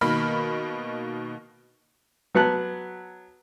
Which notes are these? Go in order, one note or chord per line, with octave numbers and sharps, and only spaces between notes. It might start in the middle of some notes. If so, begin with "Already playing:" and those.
B2 D#3 A#3 B5 F6
F#3 B3 A5 F#6